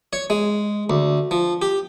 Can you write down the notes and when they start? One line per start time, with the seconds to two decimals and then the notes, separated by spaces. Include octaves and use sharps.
0.13 C#5
0.30 G#3
0.90 D2
1.31 F3
1.62 G4